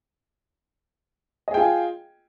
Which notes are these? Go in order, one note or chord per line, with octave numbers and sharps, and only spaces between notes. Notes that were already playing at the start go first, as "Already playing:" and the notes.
F4 G#4 D#5 G5 G#5